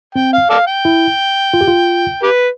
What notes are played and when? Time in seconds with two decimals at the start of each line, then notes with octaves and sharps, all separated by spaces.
0.15 C4 G5
0.33 F5
0.50 A4 D5 F5
0.67 G5
0.85 E4
1.54 F4
1.61 G4
1.68 F4
2.23 G4 B4